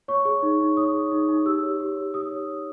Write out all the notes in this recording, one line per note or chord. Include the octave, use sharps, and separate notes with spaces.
C#5 C#6
G#4
D#4
D#4
C#5 D#6
G#4
D#4
D#4
G4 E6
C#5
G4
C#5
G4 D#6
C#5
G4